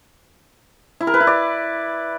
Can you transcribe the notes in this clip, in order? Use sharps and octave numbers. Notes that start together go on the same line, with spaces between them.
E4
A#4
B4
E4
D5